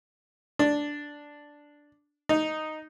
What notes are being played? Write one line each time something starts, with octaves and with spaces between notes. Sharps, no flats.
D4
D#4